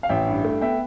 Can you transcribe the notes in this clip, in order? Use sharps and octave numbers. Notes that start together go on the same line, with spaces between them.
F5
A1 E5 G5
G2
A3
B3 E5 G5